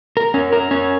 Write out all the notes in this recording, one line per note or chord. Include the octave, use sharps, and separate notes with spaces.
A#4
C#4
A#4
C#4